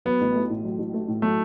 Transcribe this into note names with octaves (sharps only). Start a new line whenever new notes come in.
F#3 B3
A1
A3
A2
F#3
A1
A3
A2
F#3 A3